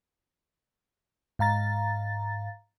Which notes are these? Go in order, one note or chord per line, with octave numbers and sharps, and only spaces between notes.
G#2 F5 A#5 A6